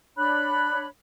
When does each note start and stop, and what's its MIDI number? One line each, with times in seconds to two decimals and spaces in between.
0.17 0.87 62
0.17 0.87 73
0.17 0.87 83
0.17 0.87 90